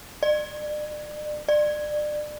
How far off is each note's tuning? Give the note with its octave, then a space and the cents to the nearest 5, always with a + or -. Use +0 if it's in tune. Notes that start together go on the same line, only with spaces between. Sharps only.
D5 +40
D5 +30